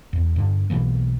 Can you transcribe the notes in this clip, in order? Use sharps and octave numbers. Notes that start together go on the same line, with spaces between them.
E2
G2 D3
B1 B2 E3 A#3